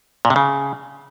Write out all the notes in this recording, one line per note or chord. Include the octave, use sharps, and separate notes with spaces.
A#2
C3
C#3